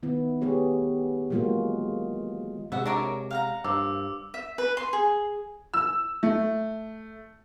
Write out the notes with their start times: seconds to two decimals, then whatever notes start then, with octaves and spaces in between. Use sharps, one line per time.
0.03 D#3 B3 E4
0.41 A3 B3 G4 G#4 C#5
1.30 E3 F#3 G#3 A#3 F4 F#4
2.72 C3 G#3 B3 F#4 E5 F#5
2.85 D4 F#4 A#4 C#5 E5 D6
3.31 F5 F#5 A#5
3.64 G2 F3 A#3 D6 E6
4.34 E5
4.58 B4
4.77 C6
4.93 G#4
5.74 E6
6.23 A3